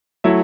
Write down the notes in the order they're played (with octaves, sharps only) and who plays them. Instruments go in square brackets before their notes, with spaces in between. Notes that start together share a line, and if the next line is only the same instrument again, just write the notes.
[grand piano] F#3 A3 E4 E5